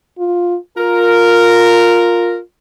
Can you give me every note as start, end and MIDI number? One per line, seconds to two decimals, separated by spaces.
0.18 0.57 65
0.78 2.41 65
0.78 2.37 70